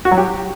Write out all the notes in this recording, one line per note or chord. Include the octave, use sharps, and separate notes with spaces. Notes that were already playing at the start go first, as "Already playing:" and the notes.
F#4
F#3
G4